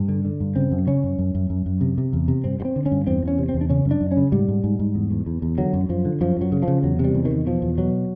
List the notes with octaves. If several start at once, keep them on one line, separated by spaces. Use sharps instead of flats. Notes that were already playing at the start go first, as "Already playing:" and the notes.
Already playing: G2
D3
D3
G2
C#3 C4
F#2
C#3 C#4
F#2
F#2
F#2
F#2
F#2
C3
C3
E2
C3
G2 C4
G2
C4
D3
C#4
G2
E2 C4
E2 C#4
C3
C4
E2
D4
C#3 C#4
F#2
D4
F#2
C#4
C#3
G#2 G3
G#2
G#2
G#2
E2
E2
E2
E2
D3 F#3
F#2
F#2 F3
D3
F#2 F3
F#2 F#3
C#3
C#3 F3
E2 F#3
C3 G3
E2
D#3
E2
B2 F3
E2
B2 F#3